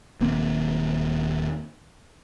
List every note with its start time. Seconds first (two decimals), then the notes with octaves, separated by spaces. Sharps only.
0.21 D#1 D#2 A#3 C4